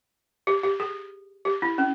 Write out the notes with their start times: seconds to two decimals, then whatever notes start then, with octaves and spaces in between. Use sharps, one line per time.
0.47 G4
0.63 G4
0.80 G#4
1.45 G4
1.62 E4
1.78 C#4